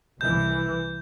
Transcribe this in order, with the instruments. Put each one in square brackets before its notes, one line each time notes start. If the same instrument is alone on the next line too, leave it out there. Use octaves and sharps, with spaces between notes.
[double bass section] C2 E3 [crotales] G6